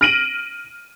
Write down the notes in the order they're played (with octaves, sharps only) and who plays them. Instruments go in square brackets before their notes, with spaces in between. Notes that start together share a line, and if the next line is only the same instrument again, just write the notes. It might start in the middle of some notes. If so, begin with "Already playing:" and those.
[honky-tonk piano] F6 A#6 D7 D#7 F#7